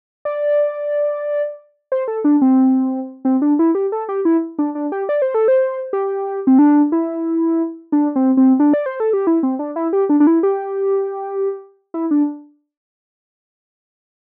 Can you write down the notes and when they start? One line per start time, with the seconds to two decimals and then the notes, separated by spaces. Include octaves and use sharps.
0.25 D5
1.92 C5
2.08 A4
2.24 D4
2.42 C4
3.25 C4
3.42 D4
3.59 E4
3.75 G4
3.92 A4
4.09 G4
4.25 E4
4.59 D4
4.75 D4
4.92 G4
5.09 D5
5.22 C5
5.34 A4
5.48 C5
5.93 G4
6.47 C4
6.59 D4
6.92 E4
7.92 D4
8.16 C4
8.37 C4
8.60 D4
8.74 D5
8.86 C5
9.00 A4
9.13 G4
9.27 E4
9.43 C4
9.59 D4
9.76 E4
9.93 G4
10.09 D4
10.20 D4
10.27 E4
10.43 G4
11.94 E4
12.11 D4